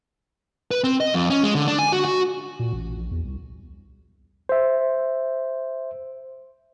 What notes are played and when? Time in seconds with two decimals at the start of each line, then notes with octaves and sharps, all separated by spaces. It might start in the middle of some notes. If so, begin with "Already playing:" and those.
0.71 B4
0.84 C4
1.00 D#5
1.14 F2
1.30 C#4
1.43 G#3
1.55 D3
1.67 D4
1.79 G#5
1.92 F#4
2.05 F#4
2.59 A#2
2.73 A1
2.97 A#1
3.11 E2
3.25 C2
4.49 C5 E5